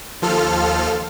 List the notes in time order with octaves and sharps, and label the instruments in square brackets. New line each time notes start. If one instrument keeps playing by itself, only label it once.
[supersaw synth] D#2 F3 F4 A4 F6